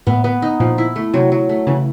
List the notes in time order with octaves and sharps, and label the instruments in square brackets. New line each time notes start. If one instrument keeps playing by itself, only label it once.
[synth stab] A2 [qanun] B3
[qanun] B3
D#4
[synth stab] A#2 [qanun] F3
[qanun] E4
A3
[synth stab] C3 [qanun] F#3
[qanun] F#3
A3
[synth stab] C#3 [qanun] E3